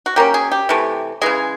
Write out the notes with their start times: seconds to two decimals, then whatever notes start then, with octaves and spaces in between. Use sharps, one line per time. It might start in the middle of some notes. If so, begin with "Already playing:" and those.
0.06 F#4
0.16 F#3 A#3 C#4 G4
0.34 G#4
0.52 G4
0.69 C3 E3 A3
1.21 C#3 E3 G#3 G#4